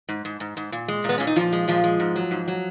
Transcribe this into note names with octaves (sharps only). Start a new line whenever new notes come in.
G#2
G#2
G#2
G#2
A#2
G#3
A#2 B3
A#2 C#4
D#4
A#2 F3 F4
G#3
A#2 F3 F4
G#3
G#2
F#3
G#2
F#3